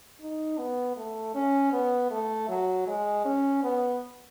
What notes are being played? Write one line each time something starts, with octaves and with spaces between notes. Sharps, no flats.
D#4
B3
A3
C#4
B3
A3
F#3
G#3
C#4
B3